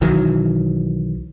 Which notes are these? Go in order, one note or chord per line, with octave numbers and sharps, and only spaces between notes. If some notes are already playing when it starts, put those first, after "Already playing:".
B1 D#3 E3 F#3